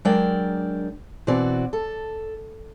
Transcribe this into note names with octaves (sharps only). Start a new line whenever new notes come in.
F#3 G#3 D4 A#4 D5 G5
B2 E3 C4 F#4 D5
A4